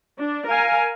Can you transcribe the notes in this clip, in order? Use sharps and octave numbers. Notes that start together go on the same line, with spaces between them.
D4
A#4 F5 G#5